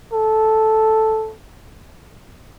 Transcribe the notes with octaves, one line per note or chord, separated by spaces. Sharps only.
A4